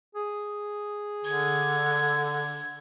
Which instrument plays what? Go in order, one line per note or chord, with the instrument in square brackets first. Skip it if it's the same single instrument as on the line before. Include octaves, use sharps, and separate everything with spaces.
[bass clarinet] G#4
[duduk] D3 [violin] G#6